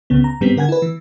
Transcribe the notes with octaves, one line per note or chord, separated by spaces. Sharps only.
C#2 C#3 B3
A#5
G#2 G3 B3 C4 B6
D3 A#4 F#5 G#5 G#6
E4 B4
E3